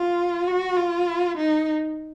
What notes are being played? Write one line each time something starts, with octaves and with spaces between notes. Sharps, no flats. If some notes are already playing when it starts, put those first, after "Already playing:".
Already playing: F4
F#4
F4
D#4